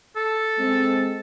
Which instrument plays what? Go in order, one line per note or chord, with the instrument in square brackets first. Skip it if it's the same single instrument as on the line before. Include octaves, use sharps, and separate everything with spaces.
[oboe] A4
[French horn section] G#3 C4